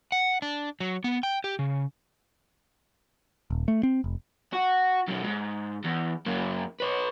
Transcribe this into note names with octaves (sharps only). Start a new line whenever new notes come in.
F#5
D4
F#3
B3
G5
G4
C#3
D#1
A3
C4
F1
F#4
F#2 B2
G#2
E2
F#2 A#3
B4 C#5